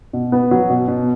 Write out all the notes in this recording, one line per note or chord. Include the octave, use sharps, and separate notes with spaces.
B2
B3
F#3
B2
B2